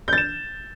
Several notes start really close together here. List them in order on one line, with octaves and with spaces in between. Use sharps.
G6 A6 E7